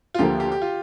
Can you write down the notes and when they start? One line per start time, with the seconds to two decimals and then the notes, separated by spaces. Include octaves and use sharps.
0.14 F4
0.19 D2 D3 F3 A#3 G4
0.40 G4
0.52 G4
0.62 F4